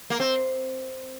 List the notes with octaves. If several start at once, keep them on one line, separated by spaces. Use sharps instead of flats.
A#3
C4